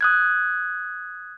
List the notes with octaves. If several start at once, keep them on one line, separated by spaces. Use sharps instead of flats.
D#6 F#6 G#6